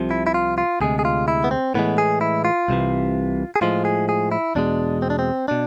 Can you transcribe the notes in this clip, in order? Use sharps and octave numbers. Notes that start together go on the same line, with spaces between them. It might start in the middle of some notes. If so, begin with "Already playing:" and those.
Already playing: C2 C3 F3
E4
E4
F4
F4
D2 C3 G#3 G#4
G#4
F4
E4
B3
C4
A2 E3 G#3 B3
G#4
E4
F4
C2 C3 E3
G#4
A2 F3 G#3 F4
G#4
G#4
E4
E2 B2 G#3 D4
C4
D4
C4
B2 D4